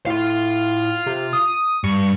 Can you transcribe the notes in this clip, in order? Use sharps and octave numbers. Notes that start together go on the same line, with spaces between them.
A2 F4 F5
C3
D#6
G2 C#6